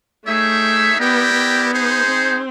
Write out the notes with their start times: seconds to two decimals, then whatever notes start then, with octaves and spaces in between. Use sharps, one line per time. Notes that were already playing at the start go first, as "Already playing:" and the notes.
0.24 A3 D#4 G#4 C#5 E5 G5
0.97 B3 E4 G4 A#4 D5 G5
1.34 B3
1.70 D#4 G#4 C5
2.06 C4